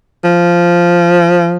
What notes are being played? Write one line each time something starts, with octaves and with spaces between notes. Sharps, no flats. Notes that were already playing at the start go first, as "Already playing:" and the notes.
F3